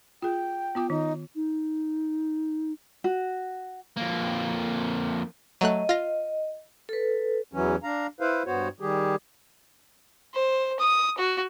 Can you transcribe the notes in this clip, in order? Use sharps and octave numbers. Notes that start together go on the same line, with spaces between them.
F4 G#4 G5
B3 F4 D6
D#3 D#4
D#4
F#4
F2 A#3
F#3 A3 D#5 F#6
F4 A#6
A4 B4
E2 E3 F#3 C#4
D4 F5 A#5
E4 B4 C5 F5
G2 B3 F#4 C5 C#5
D#3 G3 G4 G#4
C5
D#6
F#4